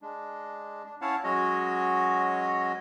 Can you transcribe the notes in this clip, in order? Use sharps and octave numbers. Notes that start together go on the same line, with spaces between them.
G#3 D4
D4
C#4 E4 C#5 F5 F#5 A5
F#3 G#3 C#4 F#4 C#5 D#5